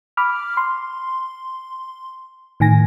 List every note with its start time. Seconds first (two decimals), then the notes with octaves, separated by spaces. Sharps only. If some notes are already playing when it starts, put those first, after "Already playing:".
0.17 B5 D6 F6
0.57 C6
2.60 A2 D#3 G#5 A#6